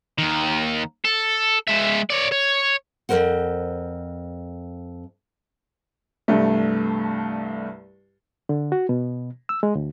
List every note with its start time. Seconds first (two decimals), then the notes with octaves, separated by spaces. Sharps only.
0.18 D#2 D#3
1.05 A4
1.67 G#3 E5
2.10 C#5 D5
2.32 C#5
3.09 F2 G#2 A#4 C5 F#5
6.28 C2 G2 A3
8.49 D3
8.72 F#4
8.89 B2
9.49 E6
9.63 G#3
9.75 D2